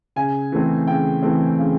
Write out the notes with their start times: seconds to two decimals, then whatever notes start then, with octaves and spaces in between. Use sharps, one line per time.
0.16 C#3 G#5
0.52 E3 A3 C4
0.87 C#3 G5
1.23 E3 A3 C4
1.59 C#3